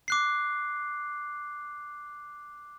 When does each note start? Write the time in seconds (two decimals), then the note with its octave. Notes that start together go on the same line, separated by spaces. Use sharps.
0.08 D6 F#6 C7